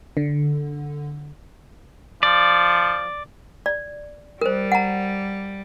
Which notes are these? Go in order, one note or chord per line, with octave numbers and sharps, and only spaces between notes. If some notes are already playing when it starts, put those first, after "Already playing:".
D3
F3 D5
D5
G3 A#4 C5
F#5 A#5